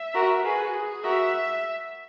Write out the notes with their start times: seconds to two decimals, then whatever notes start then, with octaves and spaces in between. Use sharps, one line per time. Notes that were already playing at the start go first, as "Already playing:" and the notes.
Already playing: E5
0.14 F#4 A#4
0.44 F#4 G#4 B4
0.74 G#4
1.04 F#4 A#4 E5